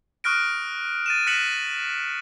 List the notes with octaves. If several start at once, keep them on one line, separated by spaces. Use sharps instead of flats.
C#6 D#6 F6 F#6 A#6 D7
A6 D#7 E7
F#6 A#6 B6 C#7 E7 F#7